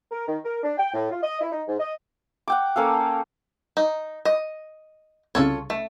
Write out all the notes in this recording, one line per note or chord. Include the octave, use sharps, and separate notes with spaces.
A#4
D#3
A#4
D4
G5
A2
F4
D#5
E4
D#4
G#2
D#5
F#5 G5 D6
A#3 C#4 A4 F5
D#4
D#5
C2 C#3 F4 A4 C#5
A3